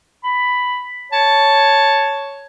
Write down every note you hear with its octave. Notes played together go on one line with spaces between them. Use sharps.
B5
C#5 A5